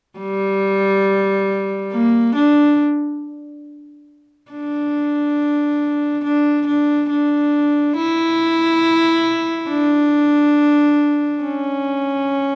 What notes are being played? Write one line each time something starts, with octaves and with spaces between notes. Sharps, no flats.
G3
A#3
D4
D4
D4
D4
D4
E4
D4
C#4